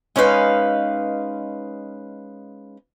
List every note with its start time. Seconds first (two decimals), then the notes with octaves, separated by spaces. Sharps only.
0.16 G#3 C#4 D#4 B4 F5